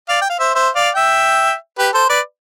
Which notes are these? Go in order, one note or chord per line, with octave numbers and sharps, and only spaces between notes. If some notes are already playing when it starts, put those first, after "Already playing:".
D5 F5
G5
F5
C5 E5
C5 E5
D5 F5
E5 G5
G4 B4
A4 C5
B4 D5